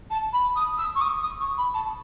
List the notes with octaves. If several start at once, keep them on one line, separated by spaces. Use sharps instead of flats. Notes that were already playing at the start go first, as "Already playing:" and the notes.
A5
B5
D#6
E6
C#6
D#6
D#6
C#6
B5
A5